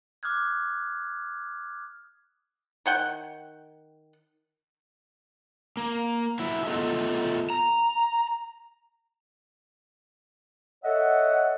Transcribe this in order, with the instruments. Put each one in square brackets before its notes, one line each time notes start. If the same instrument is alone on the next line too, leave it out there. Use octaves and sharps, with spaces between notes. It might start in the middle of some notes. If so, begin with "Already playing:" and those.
[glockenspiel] D6 D#6 F6 F#6 G#6
[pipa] D#3 F#5 G5
[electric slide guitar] A#3
F#3 E4
A3 B3 F4 A4 D#5 E5
A#5
[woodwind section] A4 C#5 D#5 E5 F#5